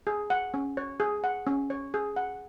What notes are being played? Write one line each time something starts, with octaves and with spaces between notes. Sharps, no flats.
G#4
F#5
C#4
C#5
G#4
F#5
C#4
C#5
G#4
F#5